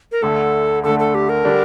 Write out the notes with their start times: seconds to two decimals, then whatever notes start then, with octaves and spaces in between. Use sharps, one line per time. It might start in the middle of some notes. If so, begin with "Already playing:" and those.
0.12 A#4
0.22 D2 D3 A3 A4
0.83 D2 D3 A3 A4
0.99 A4
1.15 G4
1.29 A#4
1.45 D3 G3 D4 G4